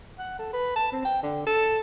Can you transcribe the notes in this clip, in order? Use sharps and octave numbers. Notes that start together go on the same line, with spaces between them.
F#5
A4
B4
A5
C4
G5
D3
A4